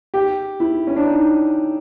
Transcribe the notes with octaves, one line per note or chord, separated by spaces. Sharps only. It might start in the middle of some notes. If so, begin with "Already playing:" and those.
G4
E4
C#4
D4
D#4